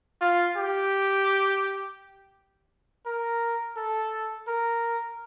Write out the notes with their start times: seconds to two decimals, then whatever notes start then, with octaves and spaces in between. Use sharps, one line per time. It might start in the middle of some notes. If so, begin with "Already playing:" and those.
0.21 F4
0.57 G4
3.06 A#4
3.77 A4
4.48 A#4